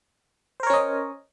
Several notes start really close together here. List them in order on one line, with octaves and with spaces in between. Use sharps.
C5 A#4 C#5 C#4 D#5